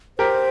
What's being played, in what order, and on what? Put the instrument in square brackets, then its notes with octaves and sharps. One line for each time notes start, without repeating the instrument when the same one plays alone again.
[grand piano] G4 A#4 [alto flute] C5